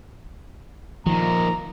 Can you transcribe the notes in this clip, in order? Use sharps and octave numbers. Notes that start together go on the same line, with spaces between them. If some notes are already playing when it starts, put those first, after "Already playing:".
A#2 D#3 F3 A#5